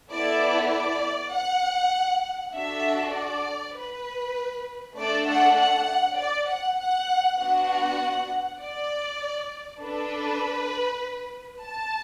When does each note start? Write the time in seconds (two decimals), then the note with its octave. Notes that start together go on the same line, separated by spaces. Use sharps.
0.11 B3 E4 A4 D5
0.72 D5
1.32 F#5
2.53 D4 F#4 A4 E5
3.14 D5
3.75 B4
4.96 A3 D4 A4 D5
5.27 F#5
5.57 F#5
6.18 D5
6.48 F#5
6.79 F#5
7.38 B3 D4 F#4 F#5
8.60 D5
9.81 D4 A4 B4
11.63 A5